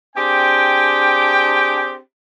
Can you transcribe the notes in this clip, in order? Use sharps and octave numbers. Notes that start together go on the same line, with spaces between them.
C4 D4 G4 G#4 G5